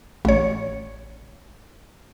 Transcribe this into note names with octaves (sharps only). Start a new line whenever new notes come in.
A1 C#5